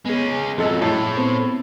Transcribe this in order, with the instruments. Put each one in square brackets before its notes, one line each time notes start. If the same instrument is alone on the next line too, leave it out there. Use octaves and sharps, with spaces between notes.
[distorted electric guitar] G#3 C#4 [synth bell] B3 G#4
[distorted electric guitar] F2 F#3 [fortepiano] G#3 A4
[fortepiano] A2 [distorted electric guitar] A4 C#5
[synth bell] B3 C4 C5